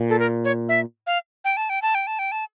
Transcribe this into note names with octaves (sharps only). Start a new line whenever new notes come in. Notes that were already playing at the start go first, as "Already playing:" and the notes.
Already playing: A#2
A4
A#4
C#5
E5
F5
G5
A5
G5
A5
G5
A5
G5
A5